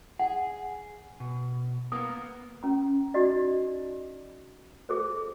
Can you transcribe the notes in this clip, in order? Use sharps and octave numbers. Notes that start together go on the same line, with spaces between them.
G#4 F#5
B2
A#3 B3 A#4 D#6
C#4 A#5
D#4 F#4 D5 D#5
G#4 A4 C5